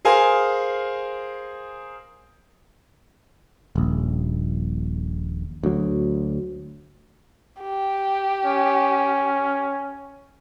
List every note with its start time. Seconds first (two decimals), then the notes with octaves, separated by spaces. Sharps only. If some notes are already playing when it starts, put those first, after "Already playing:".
0.05 G#4 A#4 C5 F5 G#5
3.76 D#1 A#1
5.63 D2 F#3
7.61 G4
8.45 C#4